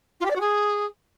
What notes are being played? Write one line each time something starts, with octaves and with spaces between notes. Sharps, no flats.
F4
G4
D5
F#4
G#4